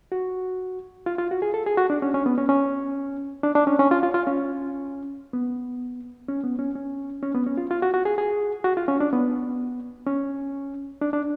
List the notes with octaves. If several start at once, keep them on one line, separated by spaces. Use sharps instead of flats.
F#4
F4
F4
F#4
G#4
A4
G#4
F#4
D4
C#4
C#4
B3
C#4
C#4
D4
D4
C#4
C#4
F4
F4
F4
C#4
B3
C#4
B3
C#4
C#4
C#4
B3
C#4
F4
F4
F#4
F#4
G#4
G#4
F#4
F4
C#4
D4
B3
C#4
D4
D4